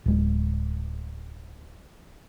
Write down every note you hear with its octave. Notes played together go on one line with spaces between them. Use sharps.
D1 G#3